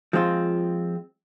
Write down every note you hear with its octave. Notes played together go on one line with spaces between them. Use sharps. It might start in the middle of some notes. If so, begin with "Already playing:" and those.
F3 G#3 C4 F4